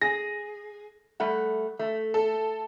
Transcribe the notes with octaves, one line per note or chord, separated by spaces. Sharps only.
G#4 A#6
G3 A3 F#5
A3
A4